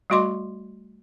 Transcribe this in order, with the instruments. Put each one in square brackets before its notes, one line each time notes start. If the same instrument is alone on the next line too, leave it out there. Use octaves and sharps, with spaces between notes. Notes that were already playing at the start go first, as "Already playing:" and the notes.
[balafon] G3 A3 F#4 D#5 C6 D6